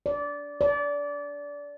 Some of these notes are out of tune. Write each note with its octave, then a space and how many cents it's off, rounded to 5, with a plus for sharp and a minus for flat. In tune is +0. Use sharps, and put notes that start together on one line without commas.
D5 -20
D5 -25